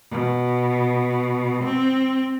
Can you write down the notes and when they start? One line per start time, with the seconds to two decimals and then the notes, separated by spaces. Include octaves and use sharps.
0.12 B2
1.64 C4